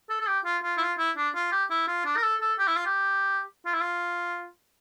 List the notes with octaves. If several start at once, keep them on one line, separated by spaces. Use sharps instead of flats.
A4
A4
G4
F4
F4
E4
F4
E4
D4
F4
G4
E4
F4
D4
A#4
A4
A4
G4
E4
F4
G4
F4
E4
F4